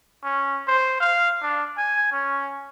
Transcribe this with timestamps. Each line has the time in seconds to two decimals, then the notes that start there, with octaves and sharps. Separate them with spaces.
0.24 C#4
0.68 C5
1.00 F5
1.42 D4
1.77 G#5
2.12 C#4